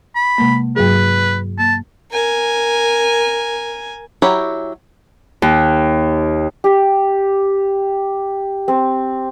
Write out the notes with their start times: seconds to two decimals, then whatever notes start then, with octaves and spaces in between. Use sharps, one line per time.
0.15 B5
0.38 C3 G#3 A#3
0.76 G2 F#3 G#4 B4
1.59 A#3 A5
2.12 A#4 G#5
4.22 F#3 E4 G4 C#5 A#5
5.42 D#2
6.64 G4
8.68 C4